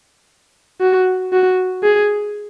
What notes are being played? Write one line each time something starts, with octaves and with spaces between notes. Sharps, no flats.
F#4
F#4
G#4